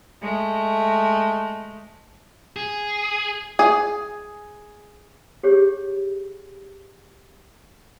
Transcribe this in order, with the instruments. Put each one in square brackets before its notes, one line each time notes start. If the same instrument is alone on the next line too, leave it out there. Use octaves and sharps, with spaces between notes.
[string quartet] G#3 A3
[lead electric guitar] G#4
[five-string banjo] G#4
[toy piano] G4 G#4 C#5